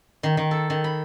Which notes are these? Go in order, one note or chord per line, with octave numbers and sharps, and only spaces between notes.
D#3
D#3
A4
D#3
B5